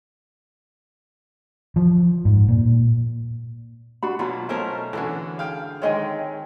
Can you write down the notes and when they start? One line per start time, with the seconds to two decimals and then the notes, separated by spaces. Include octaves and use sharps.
1.76 F3
2.25 G#2
2.48 A#2
4.03 D4 F#4 B5
4.19 B2 F#3 A#3 F4 B5
4.49 B2 A3 C#4 A#4 C5 D#5
4.93 D3 E3 C#4 D4 F#4
5.38 G#4 F5 G5
5.82 D#3 G#3 C4 C#5 D#5 G#5